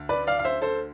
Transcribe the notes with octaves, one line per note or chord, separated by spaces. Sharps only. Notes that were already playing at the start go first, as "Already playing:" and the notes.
Already playing: D2 D3
B4 D5
D5 F5
F5
C5 E5
A4 C5